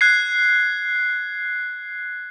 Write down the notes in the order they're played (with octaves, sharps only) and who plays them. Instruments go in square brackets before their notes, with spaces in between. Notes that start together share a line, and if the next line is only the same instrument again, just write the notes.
[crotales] F#6 G#6 C7